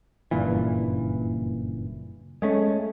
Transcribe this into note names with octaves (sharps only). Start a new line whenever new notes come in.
F#1 G2 A#2 E3
G#3 A3 C#4